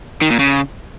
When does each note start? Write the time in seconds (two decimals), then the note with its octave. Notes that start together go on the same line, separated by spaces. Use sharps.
0.21 D#3
0.30 A#2
0.39 C#3